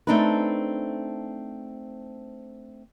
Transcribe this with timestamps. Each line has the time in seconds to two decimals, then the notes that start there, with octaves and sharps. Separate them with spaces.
0.07 A3 C4 D4 D#4 A4 B4